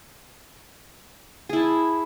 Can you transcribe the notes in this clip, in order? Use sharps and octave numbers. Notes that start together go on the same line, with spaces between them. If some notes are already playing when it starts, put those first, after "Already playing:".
E4 G#4 A5